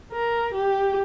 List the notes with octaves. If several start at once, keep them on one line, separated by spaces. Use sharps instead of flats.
A#4
G4